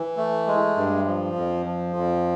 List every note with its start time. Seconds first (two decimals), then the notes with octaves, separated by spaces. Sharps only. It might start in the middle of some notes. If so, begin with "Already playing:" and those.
Already playing: E3
0.17 A3
0.47 G#3
0.76 G2
1.06 F3
1.36 F2
1.66 F3
1.96 F2